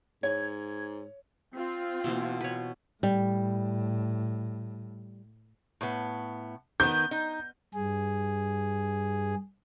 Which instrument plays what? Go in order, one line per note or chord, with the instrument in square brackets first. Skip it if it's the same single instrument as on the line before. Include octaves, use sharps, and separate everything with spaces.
[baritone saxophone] G#2 [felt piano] C#5 [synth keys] G#6
[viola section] C4 F4
[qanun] B2 E3 A#3
B4 C#5
[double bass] A2 [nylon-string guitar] G3
[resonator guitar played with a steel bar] A2 B3
[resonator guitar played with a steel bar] D#3 B3 [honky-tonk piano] G6
[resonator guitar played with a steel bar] D#4
[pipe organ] G2 G#4